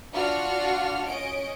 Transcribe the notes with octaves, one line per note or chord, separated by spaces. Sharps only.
D4 F4 F#4 F#5 F6
C#4 D#5 D7